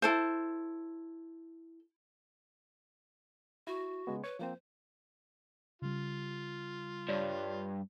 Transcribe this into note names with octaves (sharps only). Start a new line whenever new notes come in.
E4 A4 C5
E4 F#4
C#3 G#3 B3
B4 C#5
F3 A#3 C4 C5
C#3 G3 F4
G2 C#5 D5